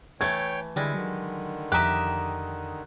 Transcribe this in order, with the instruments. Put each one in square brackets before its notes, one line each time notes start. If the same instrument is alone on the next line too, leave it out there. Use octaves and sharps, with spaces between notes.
[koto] E3 A3 [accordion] C#5 G5 [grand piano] G#6
[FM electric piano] D3 [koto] G3 G#3 [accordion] E4
[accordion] D3 D#3 [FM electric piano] F#3
[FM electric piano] F2 D#6 [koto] G4 E5 [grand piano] A#5 F#6